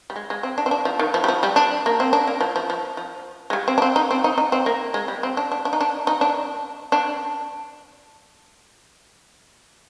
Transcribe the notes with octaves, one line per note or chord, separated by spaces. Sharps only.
G3
G#3
G#3
C4
D4
C4
D4
F3
D#3
F3
G3
F3
G3
D4
A#3
C4
D4
A#3
F3
F3
F3
F3
G#3
G3
C4
D4
C4
D#4
C4
D#4
D#4
C4
A#3
G#3
G3
C4
D4
D4
D4
D#4
D4
D#4
D4
D4